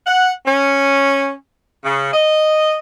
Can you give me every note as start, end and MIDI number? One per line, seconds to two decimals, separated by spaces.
0.06 0.31 78
0.46 1.33 61
1.85 2.12 49
2.14 2.78 75